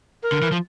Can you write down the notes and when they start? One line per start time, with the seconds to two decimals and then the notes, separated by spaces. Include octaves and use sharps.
0.23 A#4
0.32 D3
0.42 E3
0.52 F3